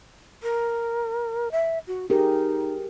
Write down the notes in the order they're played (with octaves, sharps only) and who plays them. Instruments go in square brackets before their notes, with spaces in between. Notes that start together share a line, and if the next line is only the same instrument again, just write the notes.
[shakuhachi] A#4
E5
F#4
[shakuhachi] D#4 [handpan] G4 G#4 A#4